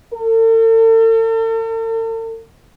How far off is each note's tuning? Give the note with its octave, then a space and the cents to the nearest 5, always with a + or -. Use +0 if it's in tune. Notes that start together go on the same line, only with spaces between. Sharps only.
A4 +45